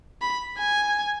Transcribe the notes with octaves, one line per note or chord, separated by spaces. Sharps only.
B5
G#5